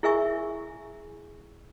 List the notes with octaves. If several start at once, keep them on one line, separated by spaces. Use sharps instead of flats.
E4 G#4 A#4 E5 G#5 C#6